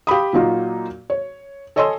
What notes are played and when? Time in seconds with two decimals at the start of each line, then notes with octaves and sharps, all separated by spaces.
0.07 G4 F5 B5 D#6
0.33 A#2 F#3 A#3 D#4 F4
1.10 C#5
1.76 A4 C#5 D#5 G#5 C6 E6